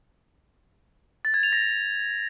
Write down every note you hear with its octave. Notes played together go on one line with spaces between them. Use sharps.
A6
G#6
F7
A#6